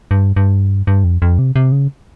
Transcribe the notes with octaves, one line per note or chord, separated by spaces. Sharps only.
G2
G2
G2
F2
F2
C3
C3
C#3